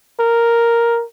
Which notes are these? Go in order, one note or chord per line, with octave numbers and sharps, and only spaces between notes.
A#4